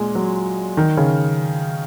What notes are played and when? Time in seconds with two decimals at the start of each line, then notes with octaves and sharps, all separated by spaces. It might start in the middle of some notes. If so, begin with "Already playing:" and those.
Already playing: A#2 G#3
0.15 F#3
0.77 D#3
0.97 C#3